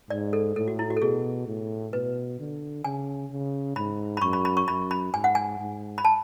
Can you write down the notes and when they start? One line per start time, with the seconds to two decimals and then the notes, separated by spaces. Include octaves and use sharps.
0.10 G#2 D5
0.33 A4
0.56 A2 A4
0.68 F#4
0.79 E4
0.90 F#4
0.97 A4
1.02 B2 G#4
1.47 A2
1.93 B2 B4
2.39 D3
2.84 C#3 G#5
3.31 C#3
3.76 G#2 B5
4.17 B5
4.22 F#2 C#6
4.33 B5
4.45 B5
4.57 C#6
4.68 F#2 B5
4.91 B5
5.13 G#2 G#5
5.24 F#5
5.35 G#5
5.59 G#2
5.98 B5
6.05 A5